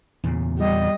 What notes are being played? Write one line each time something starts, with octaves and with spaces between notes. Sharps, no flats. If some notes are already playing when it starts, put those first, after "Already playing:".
E2 A#2 C#3
G3 D#5